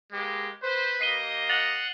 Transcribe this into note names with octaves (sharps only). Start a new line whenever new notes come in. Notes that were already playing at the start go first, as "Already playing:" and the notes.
G#3 A#3 B3 G4
B4 C5
A#3 G4 D#5 C7 D#7 G7
F#5 A6 F7 F#7